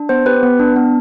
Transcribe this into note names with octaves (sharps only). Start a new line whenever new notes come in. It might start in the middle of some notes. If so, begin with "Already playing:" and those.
Already playing: D4
B3 C5
G4 B4
B3
D4
B3